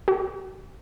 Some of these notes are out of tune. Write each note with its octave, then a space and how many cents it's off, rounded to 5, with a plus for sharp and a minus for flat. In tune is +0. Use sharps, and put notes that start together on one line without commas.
F#4 +45